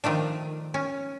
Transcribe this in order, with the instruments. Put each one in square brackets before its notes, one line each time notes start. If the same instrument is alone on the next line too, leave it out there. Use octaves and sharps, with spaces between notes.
[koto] D#3 F3 A3 D4
C#4